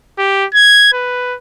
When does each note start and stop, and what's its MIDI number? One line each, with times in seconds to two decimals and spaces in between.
0.19 0.46 67
0.54 0.90 92
0.93 1.36 71